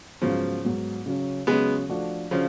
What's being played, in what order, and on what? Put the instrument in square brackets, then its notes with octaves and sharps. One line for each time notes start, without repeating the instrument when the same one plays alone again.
[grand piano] G#2 F#3 B3 [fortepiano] C#3 F3
[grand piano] G#2 F#3 B3
C#3 F#3 C#4
[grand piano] C#3 F#3 C#4 [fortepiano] G#3 B3
[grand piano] F3 A3 D4 F#4
[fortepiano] C#3 F3 [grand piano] D4 F#4